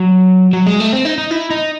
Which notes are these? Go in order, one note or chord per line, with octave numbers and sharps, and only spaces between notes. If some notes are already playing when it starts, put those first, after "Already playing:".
Already playing: F#3
F#3
G#3
A3
C4
D#4
D#4
E4
D#4